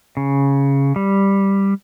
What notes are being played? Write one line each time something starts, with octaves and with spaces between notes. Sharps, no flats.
C#3
G3